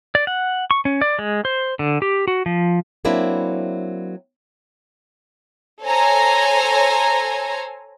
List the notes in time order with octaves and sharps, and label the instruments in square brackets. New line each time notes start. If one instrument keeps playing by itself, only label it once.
[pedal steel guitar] D5
F#5
C#6
C#4
D5
G#3
C5
D3
G4
F#4
F3
[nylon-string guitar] F#3 A#3 C4 D4 E4
[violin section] A4 C5 C#5 G#5 A#5